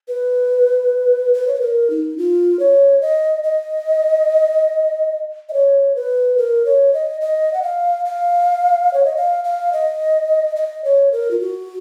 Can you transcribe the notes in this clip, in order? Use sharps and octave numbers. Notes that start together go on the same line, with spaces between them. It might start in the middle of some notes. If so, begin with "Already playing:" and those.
B4
B4
C#5
B4
A#4
D#4
F4
C#5
D#5
D#5
D#5
C#5
B4
A#4
C#5
D#5
D#5
F#5
F5
F5
C#5
D#5
F5
F5
D#5
D#5
C#5
A#4
F4
F#4